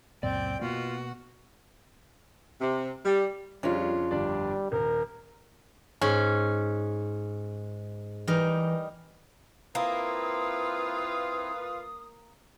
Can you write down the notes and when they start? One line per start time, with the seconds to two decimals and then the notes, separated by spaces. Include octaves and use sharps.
0.23 C#2 F#2 A#2 C4 D5 G5
0.61 B2 A#3 F4 F#4
2.61 C3
3.06 G3
3.63 F2 C#3 G3 C#4 D4 F4
4.11 G1 G3 D4 D5
4.72 D#1 A#4
6.01 G#2 C#4 B5
8.27 E3 G3 D#4 A#4
9.75 A#3 C4 E4 F4 B4 D#6